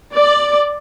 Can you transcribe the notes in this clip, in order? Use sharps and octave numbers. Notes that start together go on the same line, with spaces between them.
D5